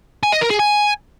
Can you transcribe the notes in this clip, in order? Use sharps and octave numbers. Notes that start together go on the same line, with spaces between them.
G#5
D#5
A#4
G#4
G#5